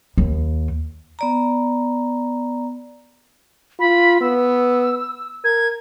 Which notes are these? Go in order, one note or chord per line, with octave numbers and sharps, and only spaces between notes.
D#2
B3 D5 A#5
F4 B5
B3 E6
A#4 G#6